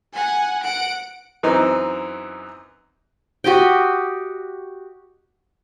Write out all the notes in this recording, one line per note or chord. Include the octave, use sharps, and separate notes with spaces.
F#5 G#5
F#5 D7
F#2 E3 C4 D#4
F#4 G4 D#5 G5